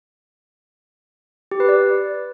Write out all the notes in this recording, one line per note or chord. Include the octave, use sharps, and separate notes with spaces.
G4
B4
D5